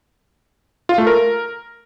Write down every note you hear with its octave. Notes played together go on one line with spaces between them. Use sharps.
F4
A3
A#4